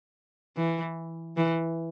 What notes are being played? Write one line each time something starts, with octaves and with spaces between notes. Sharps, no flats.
E3
E3